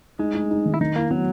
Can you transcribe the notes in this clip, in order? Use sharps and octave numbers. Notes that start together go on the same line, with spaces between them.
G#3 D#4
D#4
D#4
D#3
E4
D#3 D#4
A#3 E4
F#3 B3